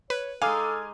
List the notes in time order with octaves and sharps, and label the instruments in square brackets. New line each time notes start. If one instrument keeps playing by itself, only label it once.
[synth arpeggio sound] B4 [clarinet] C#5
[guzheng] G#3 D#4 [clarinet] A4 [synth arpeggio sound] F5 [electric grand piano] G#5 D6 F6